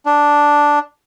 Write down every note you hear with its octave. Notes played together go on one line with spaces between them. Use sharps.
D4